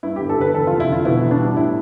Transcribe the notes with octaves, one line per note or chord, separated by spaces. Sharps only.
G2 E4
G1 G4
A4
D3 B4
E2 A4
F1 F4
E4
D3 F4
B2 E4
E2
D4
G3
A2 E4